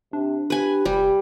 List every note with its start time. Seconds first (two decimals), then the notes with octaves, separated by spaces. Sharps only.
0.13 C3 D4
0.50 G4 B4 G#5
0.85 F1 G3